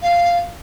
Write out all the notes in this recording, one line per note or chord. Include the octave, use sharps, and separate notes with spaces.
F5